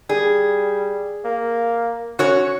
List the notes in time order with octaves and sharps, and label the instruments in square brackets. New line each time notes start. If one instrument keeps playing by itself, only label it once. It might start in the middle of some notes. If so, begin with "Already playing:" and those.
[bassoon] G3 [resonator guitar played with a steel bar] G#4
[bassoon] A#3
[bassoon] C#4 [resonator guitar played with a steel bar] F#4 C#5